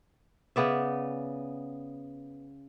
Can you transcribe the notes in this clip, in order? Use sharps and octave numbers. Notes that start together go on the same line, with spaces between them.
C#3 B3 D5 E5